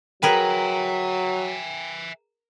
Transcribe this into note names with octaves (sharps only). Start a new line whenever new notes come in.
F#3 G#4 A#4 B4 E5 G5 G#5 F#7